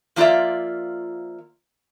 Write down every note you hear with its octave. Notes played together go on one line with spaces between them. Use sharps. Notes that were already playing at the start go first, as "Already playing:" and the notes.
F3 A#3 F4 B4 D5 E5